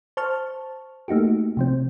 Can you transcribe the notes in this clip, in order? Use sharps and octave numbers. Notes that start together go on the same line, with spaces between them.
C5 A5 C#6 F6
A3 A#3 D#4 F#4 G4
C3 F3 C4